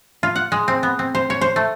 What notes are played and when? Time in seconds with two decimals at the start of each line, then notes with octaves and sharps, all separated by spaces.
0.23 F4
0.36 F#5
0.52 G#3
0.68 C4
0.83 B3
0.99 C4
1.15 C5
1.30 C#5
1.41 C5
1.56 A3